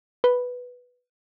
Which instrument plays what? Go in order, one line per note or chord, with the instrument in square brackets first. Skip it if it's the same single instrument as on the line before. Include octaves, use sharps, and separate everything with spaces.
[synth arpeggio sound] B4